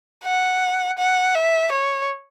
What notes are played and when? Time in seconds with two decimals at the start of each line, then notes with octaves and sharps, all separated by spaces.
0.25 F#5
0.98 F#5
1.35 E5
1.72 C#5